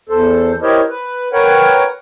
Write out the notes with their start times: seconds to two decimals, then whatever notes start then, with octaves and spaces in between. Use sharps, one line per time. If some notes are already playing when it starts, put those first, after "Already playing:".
0.09 E2 A4 C5
0.62 E4 G4 A#4 C5 C#5 D#5
0.89 B4
1.33 A#4 B4 C#5 F#5 G5